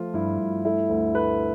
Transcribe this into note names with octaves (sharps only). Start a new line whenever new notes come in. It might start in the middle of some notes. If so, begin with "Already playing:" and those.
Already playing: F3 A3 F4
G2 E4
G2
A3 E4
D2
A3 B4